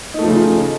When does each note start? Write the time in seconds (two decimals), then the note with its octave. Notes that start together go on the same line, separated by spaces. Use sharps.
0.14 D#4
0.19 A3
0.23 F3
0.28 C#3